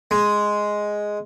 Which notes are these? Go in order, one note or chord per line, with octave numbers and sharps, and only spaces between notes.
G#3